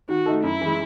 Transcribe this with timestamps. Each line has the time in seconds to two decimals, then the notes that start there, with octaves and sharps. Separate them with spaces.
0.09 D#3 F#4
0.26 A3 D#4 A4
0.43 F#2 E4
0.61 E3 G#3